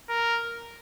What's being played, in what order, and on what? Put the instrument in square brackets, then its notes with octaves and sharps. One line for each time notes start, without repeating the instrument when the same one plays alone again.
[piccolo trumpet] A#4